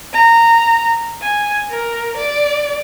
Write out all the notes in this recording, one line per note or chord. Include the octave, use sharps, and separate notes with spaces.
A#5
G#5
A#4
D5